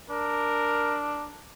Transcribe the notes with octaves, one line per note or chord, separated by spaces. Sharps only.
D4 A#4